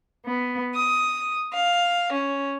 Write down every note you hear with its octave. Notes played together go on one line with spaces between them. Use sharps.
B3
D#6
F5
C#4